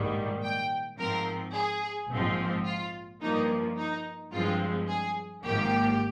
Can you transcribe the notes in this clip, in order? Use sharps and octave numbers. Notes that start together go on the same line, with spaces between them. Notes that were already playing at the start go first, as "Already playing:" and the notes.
Already playing: A#1 G#2 D#3 G3
G5
G#2 F3 C4 A#4
G#4
A#1 G#2 F3 C4
F4
G2 F3 A#3 D#4
D#4
G2 F3 G#3 C4 F4
G#4
G#1 G#2 F3 A#3 G4